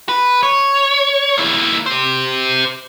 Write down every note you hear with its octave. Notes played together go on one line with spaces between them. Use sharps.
B4
C#5
A#3 E4
G4 C5